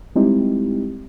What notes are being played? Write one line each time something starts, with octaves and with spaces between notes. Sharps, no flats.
G3 G#3 C4 D#4 E4 G4